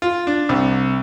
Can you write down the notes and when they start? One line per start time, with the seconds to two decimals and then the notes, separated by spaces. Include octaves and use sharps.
0.02 F4
0.27 D4
0.49 C2